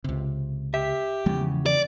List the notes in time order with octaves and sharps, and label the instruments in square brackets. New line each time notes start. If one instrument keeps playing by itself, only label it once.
[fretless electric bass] C#2 C3
[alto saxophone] G4 [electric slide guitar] E5
[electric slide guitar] E2 C#3 [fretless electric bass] F3 G#3 B3
[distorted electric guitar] D5